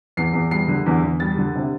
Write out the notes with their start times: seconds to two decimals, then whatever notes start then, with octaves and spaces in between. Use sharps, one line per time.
0.17 E2 C7
0.33 E2
0.51 G3 C7
0.68 D3
0.86 E2
1.03 E2
1.20 G3 A6
1.38 D3
1.55 C3